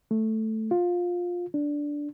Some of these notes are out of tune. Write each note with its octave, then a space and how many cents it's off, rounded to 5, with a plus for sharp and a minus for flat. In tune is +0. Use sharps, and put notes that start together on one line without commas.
A3 +0
F4 +15
D4 -5